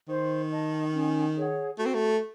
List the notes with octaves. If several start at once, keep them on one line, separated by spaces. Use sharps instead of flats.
D#3 C5
D#5 A5
C#4
G#4 C#5 F#5
A3 F#4
C4
A3